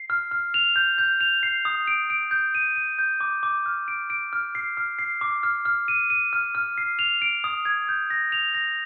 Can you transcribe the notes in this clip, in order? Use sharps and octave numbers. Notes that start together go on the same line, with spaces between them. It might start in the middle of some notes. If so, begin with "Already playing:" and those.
Already playing: C7
F6
F6
F7
G6
G6
F7
C7
D#6
D7
D7
G6
D#7
D#7
G6
D6
D6
F6
D7
D7
F6
C7
F6
C7
D6
F6
F6
D#7
D#7
F6
F6
C7
F7
D7
D#6
G#6
G6
A#6
F7
A#6